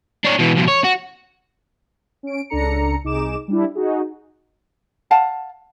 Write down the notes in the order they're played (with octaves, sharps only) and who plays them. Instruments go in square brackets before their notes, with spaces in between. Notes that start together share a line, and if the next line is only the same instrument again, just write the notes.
[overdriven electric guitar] D4 C#5
B2 E3
F2 B2
C#5
F#4
[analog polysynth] C#4 D7
C#2 C#3 D4 A4 A#5 C#7
C2 D#4 G#4 D6 E7
G3 D4 E4
D#4 F#4 G#4
[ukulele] F5 F#5 A5